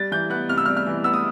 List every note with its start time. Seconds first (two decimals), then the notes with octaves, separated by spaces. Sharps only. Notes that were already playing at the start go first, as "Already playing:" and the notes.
Already playing: G3 A6
0.11 E3 G6
0.30 B3 F#6
0.49 C3 F6
0.58 E6
0.65 G3 F6
0.77 F6
0.87 E3
1.04 B3 E6
1.13 D#6